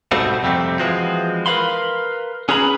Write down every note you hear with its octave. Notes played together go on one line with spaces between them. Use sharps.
G#2 B2 G3 A3 C4 F#4
F2 C3 G3 A3 C4
E3 F3 G#3 C4 F4 F#4
A#4 B4 C#5 F5 B5 C6
C#4 G#4 B4 A#5 B5